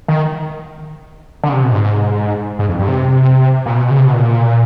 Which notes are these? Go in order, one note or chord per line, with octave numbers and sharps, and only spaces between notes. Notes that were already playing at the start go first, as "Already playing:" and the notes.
D#3
D3
C#3
C3
B2
G#2
G#2
F2
G2
C3
A#2
B2
C#3
C3
B2
A#2